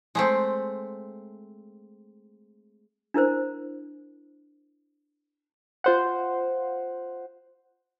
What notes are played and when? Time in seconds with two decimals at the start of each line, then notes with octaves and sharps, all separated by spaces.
0.15 G#3 A3 C4
3.14 D4 E4 A#4 C5
5.84 F4 C5 F#5